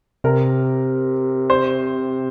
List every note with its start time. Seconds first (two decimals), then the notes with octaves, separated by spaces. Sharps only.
0.24 C3 A#4
1.50 C5